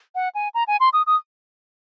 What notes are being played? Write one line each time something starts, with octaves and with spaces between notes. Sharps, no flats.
F#5
G#5
A#5
G#5
C6
D#6
D#6